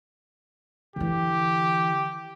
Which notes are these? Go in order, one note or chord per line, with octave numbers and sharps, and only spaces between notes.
D3 E3 G4